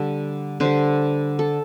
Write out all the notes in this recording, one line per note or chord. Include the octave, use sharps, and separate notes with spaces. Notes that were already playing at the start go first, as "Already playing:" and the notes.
Already playing: D3 G3
D3 G3 C5
A4